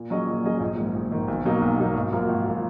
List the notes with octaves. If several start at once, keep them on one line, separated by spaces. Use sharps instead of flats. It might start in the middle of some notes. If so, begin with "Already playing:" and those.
Already playing: A#2
F#3 C#4 G#4 D#5
A#2
F#3 C#4 G#4 D#5
A#1
G#2 D#3
A#1
G#2 D#3
B1
B2 F#3 A#3 D#4
B1
B2 F#3 A#3 D#4
G#1
F#2 F3 A#3
G#1
F3 A#3